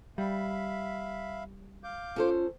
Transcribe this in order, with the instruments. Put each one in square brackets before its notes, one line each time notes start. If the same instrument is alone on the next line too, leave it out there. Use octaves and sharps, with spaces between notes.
[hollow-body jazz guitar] G3 [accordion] E5 F5 B5
[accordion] F5 D6 G6
[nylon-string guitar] C#4 A4 C5 [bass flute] F4